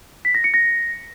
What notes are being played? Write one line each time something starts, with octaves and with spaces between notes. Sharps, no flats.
B6
A#6
C#7
A#6